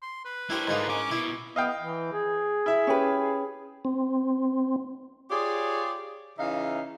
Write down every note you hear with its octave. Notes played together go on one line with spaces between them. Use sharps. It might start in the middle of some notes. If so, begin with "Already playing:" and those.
C6
B4
D4 E4 G4 A#4 C5
G#2 D3 A#3 D#4 F4
C#4 D6
B2 E4
B3 D#5 F5 G5
E3
G#4
E4 E5
C#4 G4 B4
C4
F4 G4 G#4 C#5 D5
C#3 E3 D#4 E5 F5